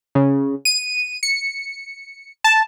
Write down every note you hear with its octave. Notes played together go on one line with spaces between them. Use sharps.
C#3
D#7
C#7
A5